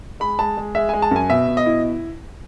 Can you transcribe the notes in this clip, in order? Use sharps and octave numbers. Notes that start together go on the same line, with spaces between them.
G#3 B5
G#3 A5
G#3
G#3 E5
G#3 G#5
A5
F#2 G#5
B2 E5
B2
D#5
E4